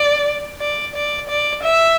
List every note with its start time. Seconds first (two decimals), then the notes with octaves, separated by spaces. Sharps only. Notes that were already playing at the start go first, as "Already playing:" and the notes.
Already playing: D5
0.61 D5
0.96 D5
1.29 D5
1.63 E5